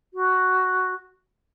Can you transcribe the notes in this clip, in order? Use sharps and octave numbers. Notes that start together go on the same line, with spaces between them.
F#4